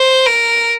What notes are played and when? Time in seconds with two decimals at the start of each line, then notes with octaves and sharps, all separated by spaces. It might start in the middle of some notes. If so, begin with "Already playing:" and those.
Already playing: C5
0.27 A#4